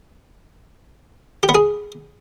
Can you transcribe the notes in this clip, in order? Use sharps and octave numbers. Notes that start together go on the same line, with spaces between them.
G4
B3
G#4